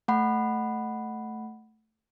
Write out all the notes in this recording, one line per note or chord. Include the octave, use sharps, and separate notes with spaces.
A3 F#5 B5